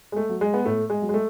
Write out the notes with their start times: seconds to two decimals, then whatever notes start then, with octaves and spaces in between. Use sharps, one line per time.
0.12 G#3
0.16 A3
0.29 F#3
0.41 G#3
0.54 B3
0.65 A2 A3
0.90 G#3
1.02 F#3
1.09 G#3
1.14 A3